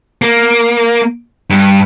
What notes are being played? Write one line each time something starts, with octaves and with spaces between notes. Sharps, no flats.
A#3
G2